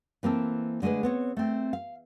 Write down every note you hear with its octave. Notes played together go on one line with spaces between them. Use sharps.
E3 A#3 C4 A4
D3 G#3 A3 G#4 B4
B3 C4 C#5
A3 C4
F5